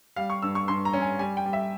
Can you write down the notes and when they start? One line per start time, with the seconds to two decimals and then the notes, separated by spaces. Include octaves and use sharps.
0.16 G3 F5
0.30 C#6
0.42 G2 E6
0.55 C#6
0.68 G2 C6
0.85 A#5
0.93 C#4
1.02 G#5
1.19 G3 G#5
1.37 G5
1.45 G3
1.53 E5